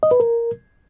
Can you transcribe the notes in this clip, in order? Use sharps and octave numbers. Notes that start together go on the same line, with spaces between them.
D#5
B4
A#4